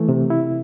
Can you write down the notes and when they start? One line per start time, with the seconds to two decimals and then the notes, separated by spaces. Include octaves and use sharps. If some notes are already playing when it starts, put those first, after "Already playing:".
Already playing: E3 A3
0.09 C3
0.30 E4